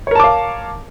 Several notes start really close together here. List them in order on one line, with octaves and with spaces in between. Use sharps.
C#5 A#4 A5 D6 F5